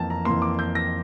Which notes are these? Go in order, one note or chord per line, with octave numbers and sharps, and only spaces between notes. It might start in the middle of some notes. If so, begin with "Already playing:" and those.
Already playing: F2 E3 A#3 G5 A5
A#5
F2 E3 A#3 C6
D6
G6
A#6